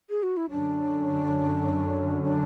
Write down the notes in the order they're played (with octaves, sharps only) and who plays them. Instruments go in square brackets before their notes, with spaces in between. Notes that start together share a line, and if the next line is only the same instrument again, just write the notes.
[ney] G#4
F#4
E4
[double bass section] F#2 D3 F#3 C#4 [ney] D4
[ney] D4